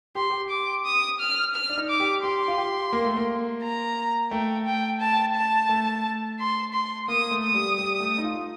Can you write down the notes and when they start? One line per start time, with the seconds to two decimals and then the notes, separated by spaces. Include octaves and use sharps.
0.15 G4 C6
0.30 G4
0.50 D6
0.85 D#6
1.20 F6
1.55 F6
1.69 D4
1.78 D#4
1.89 D6
2.00 G4
2.23 G4 C6
2.48 F4
2.58 G4
2.93 A#3
3.05 A3
3.17 A#3
3.63 A#5
4.31 A3 G5
4.65 G5
5.00 A5
5.36 A5
5.69 A3
6.39 C6
6.73 C6
7.08 A#3 D#6
7.31 A3
7.44 D#6
7.54 G3
7.78 G3
8.00 A3
8.18 D#4
8.24 F4